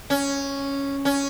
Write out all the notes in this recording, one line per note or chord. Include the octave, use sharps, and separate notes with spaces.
C#4
C#4